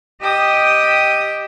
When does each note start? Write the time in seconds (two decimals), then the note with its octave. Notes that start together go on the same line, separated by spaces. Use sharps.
0.22 G4 D#5 G5 D#6 E6